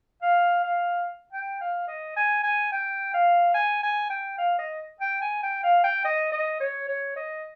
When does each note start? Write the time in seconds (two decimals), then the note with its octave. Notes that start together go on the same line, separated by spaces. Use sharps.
0.22 F5
0.63 F5
1.33 G5
1.61 F5
1.88 D#5
2.16 G#5
2.43 G#5
2.72 G5
3.14 F5
3.54 G#5
3.83 G#5
4.10 G5
4.38 F5
4.59 D#5
5.01 G5
5.21 G#5
5.43 G5
5.63 F5
5.84 G5
6.05 D#5
6.32 D#5
6.60 C#5
6.88 C#5
7.16 D#5